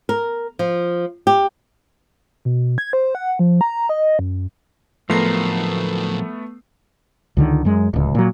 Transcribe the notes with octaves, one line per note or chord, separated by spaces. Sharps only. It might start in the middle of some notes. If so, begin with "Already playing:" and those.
A#4
F3
G4
B2
G#6
C5
F#5
F3
A#5
D#5
F#2
A2 F3 F#3 A3 B3 A#4 C7
C#2 D3 D#3
F#2 G#3
D1 C#2
A#2 F#3